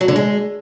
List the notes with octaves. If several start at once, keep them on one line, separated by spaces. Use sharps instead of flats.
F#3
D3
G#3